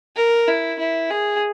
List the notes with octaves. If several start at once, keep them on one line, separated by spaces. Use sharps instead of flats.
A#4
E4
E4
G#4